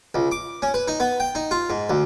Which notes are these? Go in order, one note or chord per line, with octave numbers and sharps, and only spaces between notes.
C#2
D6
C#4
B4
D#4
B3
G5
D#4
F4
G#2
D2